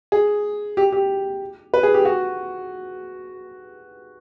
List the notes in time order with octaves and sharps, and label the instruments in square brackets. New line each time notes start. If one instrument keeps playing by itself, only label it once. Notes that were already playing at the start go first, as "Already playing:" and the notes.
[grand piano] G#4
G4
G4
B4
G#4
G4
F#4